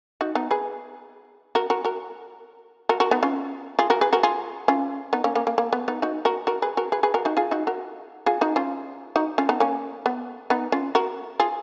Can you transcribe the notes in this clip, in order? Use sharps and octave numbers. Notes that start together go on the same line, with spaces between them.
D#4 F#4
B3 D#4
G#4 B4
F#4 A#4
F#4 A#4
F#4 A#4
F#4 A#4
F#4 A#4
B3 D#4
C#4 F4
F4 G#4
F#4 A#4
G#4 B4
F#4 A#4
F4 G#4
C#4 F4
B3 D#4
A#3 C#4
A#3 C#4
A#3
A#3
B3
B3 D#4
D#4 F#4
F#4 A#4
F#4 A#4
G#4 B4
F#4 A#4
G#4 B4
G#4 B4
F#4 A#4
D#4 F#4
F4 G#4
D#4 F#4
F#4 A#4
F4 G#4
D#4 F#4
C#4 F4
D#4 F#4
C#4 F4
B3 D#4
A#3 C#4
B3
B3 D#4
C#4 F4
F#4 A#4
F4 G#4